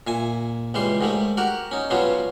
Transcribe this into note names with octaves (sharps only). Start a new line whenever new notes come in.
A#2 E5 G#5
C#2 E3 G3 E5 C6
G#2 D#3 G3 A3
F#4 G4 A#4 F#5
C#4 D#4
B2 F#3 G3 B3 C#4 F4